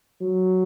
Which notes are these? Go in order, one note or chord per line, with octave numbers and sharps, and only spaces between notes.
F#3